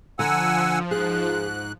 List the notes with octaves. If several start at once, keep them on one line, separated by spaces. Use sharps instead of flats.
D3 F3 F#5 G#5 A#5 E6
G#2 G#4 F#6